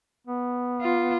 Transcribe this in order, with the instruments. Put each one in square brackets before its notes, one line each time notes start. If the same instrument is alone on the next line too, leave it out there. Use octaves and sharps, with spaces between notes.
[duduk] B3
[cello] F4